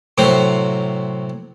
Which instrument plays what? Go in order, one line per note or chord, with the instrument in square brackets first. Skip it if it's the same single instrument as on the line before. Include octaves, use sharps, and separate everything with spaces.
[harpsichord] A2 C3 F#3 C5 G5